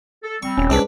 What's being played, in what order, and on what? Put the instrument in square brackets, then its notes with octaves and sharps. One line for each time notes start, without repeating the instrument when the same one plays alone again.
[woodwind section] A4
[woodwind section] G3 C4 [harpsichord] C#6
[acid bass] D#1 [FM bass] C#4
[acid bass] C2 [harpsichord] G#2 D4 B4